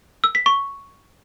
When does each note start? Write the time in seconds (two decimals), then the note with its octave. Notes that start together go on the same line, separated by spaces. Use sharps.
0.24 E6
0.35 B6
0.46 C#6